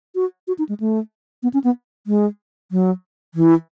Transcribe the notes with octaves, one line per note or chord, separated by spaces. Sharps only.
F#4
F#4
D#4
G#3
A3
B3
C#4
B3
G#3
F#3
E3